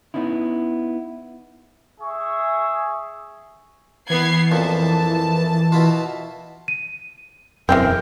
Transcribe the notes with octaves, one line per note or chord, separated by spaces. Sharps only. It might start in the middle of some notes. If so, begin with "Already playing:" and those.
B3 C#4 D#4 E4
G#4 E5 C#6
E3 B3 G#6 C7
F2 A#2 A5
B2 E4 F4
D#7
E1 F#2 E3 G#3 C4 A#4 F6 G6